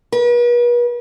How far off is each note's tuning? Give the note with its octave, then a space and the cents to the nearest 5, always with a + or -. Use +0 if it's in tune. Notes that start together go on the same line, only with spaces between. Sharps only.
B4 -45